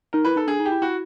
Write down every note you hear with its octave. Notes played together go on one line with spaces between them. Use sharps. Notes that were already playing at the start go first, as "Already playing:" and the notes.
D#4 A#4
E4 B4
D#4 A4
D4 G#4
D#4
G4
E4
E4 F#4